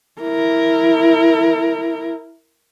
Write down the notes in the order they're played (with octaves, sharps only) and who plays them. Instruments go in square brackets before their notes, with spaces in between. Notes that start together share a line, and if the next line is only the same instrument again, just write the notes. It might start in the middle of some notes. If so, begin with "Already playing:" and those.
[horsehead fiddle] E4 A#4